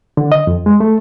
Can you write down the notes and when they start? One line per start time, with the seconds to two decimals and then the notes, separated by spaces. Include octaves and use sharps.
0.17 D3
0.32 D#5
0.47 F2
0.66 G#3
0.80 A3